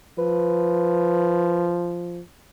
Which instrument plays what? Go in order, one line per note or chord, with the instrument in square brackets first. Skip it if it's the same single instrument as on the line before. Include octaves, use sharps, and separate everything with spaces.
[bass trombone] F3 [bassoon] B4